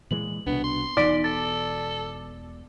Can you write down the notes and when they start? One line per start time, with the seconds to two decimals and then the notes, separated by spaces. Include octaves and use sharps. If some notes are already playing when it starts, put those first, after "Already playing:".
0.11 A#2 E3 G#3 F#7
0.46 C2 B2 B3 D4
0.64 C6
0.97 E1 E2 B2 D#4 D5 B6 D7
1.24 A4 A6